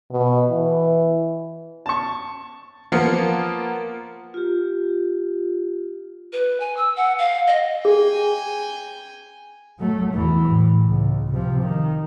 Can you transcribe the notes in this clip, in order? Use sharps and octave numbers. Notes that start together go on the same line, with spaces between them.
B2
E3
A5 C#6
F3 A#3 B3 F4
F4 G4
B4
G#5
E6
F#5
F5
D#5
G#4 G5 G#5
F#3 A3
E2 E3
A2
C#2
C3 F3
D#3